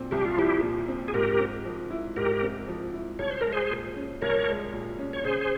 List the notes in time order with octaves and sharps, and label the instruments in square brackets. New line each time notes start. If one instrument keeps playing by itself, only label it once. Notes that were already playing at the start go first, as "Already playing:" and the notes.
Already playing: [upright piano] A#2 F3 C4
[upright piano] C2 [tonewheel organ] G4
[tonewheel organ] F4
[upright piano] F3 [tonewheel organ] E4 G4
[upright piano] A#2
C4
[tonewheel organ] G#4
[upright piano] G#2 [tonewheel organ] G4 A#4
[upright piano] C4
F3
E4
[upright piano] G#2 [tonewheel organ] G4 A#4
[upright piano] C4
F3
E4
[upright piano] C2 [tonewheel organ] C#5
[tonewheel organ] C5
[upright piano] G#3 [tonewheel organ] A#4
[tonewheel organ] G#4 C5
[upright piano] A#2
C#4
[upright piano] C2 [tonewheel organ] A#4 C#5
[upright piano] G#3
A#2
C#4
[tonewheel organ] C#5
[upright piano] C#3 [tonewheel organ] G#4 C5